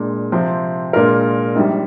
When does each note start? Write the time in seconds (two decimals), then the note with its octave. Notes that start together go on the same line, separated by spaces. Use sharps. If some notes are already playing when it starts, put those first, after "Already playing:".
Already playing: A#2 G#3 D4
0.32 C3 F3 C4
0.93 A#2 G#3 D4 F4 A#4
1.55 A#1 G#2 G3